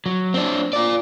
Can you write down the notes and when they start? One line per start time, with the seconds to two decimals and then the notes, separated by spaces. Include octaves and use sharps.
0.06 F#3
0.34 C4 D4
0.73 F4 D5